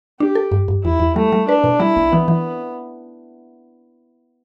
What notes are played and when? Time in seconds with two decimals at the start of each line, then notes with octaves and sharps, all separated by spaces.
0.20 D4 G4
0.35 A4
0.52 G2
0.68 G2
0.84 E2 E4
1.00 E2
1.16 G3 A3
1.32 G3
1.48 D4 B4
1.64 B2
1.80 G3 E4
1.96 B1
2.12 E3 B3
2.28 E3